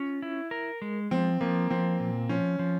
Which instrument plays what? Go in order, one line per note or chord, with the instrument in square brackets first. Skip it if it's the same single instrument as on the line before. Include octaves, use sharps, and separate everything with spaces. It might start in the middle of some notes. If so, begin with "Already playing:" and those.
Already playing: [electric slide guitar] C#4 F4
E4
A#4
G#3
[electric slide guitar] F3 [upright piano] C4
[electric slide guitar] F3 [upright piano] A#3
[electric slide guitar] F3 [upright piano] C4
[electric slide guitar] A#2
[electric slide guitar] F3 [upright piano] C#4
[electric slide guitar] F3